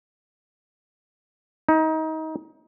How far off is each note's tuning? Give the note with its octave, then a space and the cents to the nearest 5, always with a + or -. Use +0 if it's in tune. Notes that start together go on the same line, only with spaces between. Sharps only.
D#4 +25